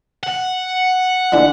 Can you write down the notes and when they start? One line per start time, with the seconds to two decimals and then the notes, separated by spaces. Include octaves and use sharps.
0.23 F#5
1.32 D3 E3 D4